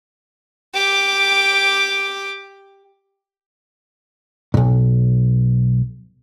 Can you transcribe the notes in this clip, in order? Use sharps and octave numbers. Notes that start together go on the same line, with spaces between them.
G4 D6
B1 G#2